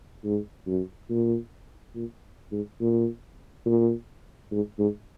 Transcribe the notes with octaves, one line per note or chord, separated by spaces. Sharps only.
G#2
F#2
A#2
A#2
G#2
A#2
A#2
G#2
G#2